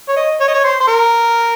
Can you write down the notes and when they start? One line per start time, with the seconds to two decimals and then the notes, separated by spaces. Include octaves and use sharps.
0.08 C#5
0.16 D#5
0.40 C#5
0.48 D#5
0.54 C#5
0.64 C5
0.80 C5
0.87 A#4